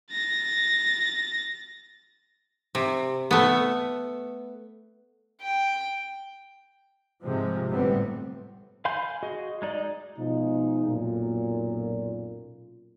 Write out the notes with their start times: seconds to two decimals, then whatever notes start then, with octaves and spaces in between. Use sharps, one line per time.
0.11 A6 A#6
2.75 C3
3.31 A3 B3
5.42 G5
7.23 G#2 C3 F3 G#3
7.69 G1 A2 G3 B3 C4
8.85 F5 G#5 B5 C6 G6
9.23 F#4 G#4 D#5
9.62 G#3 D#4 D5 D#5
10.17 B2 F3 G#3 D#4
10.86 B1 F#2 A#2